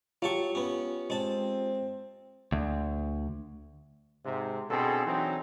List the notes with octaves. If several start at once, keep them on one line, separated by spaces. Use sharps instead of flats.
F#3 F4 G4 A5 C#6
B3 C#4
G#3 C4 A5
D2
G#2 C3
B2 D3 C4 G#4 A4
E3 F#3 C4 D4 D#4